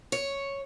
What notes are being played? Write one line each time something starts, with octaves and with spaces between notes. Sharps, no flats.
C#5